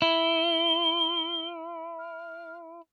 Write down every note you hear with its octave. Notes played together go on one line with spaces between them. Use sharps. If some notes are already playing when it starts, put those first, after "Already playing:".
E4 G7
F6